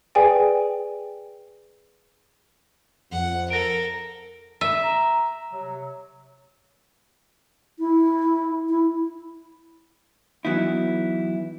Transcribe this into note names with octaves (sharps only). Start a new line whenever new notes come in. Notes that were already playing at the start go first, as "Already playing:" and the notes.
G#4 B4 D5 G5 G#5
F2 F#5
A4 A#4 A#6 D7
E5
A#5
C3 F#3
E4
E4
E3 F#3 B3 D#4 E4